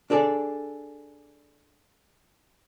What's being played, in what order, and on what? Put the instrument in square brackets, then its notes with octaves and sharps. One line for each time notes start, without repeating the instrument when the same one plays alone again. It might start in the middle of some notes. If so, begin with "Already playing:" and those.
[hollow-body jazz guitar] D4 G#4 A4 D5